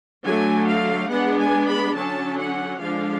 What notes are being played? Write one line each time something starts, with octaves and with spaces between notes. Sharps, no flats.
D3 F#3 A3 G#5
F5
G#3 B3 D4 F#5
G#5
B5
D3 F#3 C#4 A5
F#5
D3 F3 G#3 D4 F5